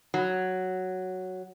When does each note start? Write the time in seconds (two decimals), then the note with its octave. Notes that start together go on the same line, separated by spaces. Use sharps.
0.14 F#3